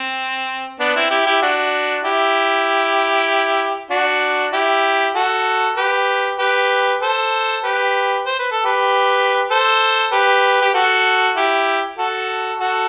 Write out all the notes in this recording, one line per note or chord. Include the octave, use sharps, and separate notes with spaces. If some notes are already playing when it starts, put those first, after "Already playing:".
Already playing: C4
B3 D4
C4 E4
E4 G4
E4 G4
D4 F#4
E4 G4
D4 F#4
E4 G4
F#4 A4
G4 B4
G4 B4
A4 C5
G4 B4
C5
B4
A4
G4 B4
A4 C5
G4 B4
G4
F#4 A4
E4 G4
F#4 A4
F#4 A4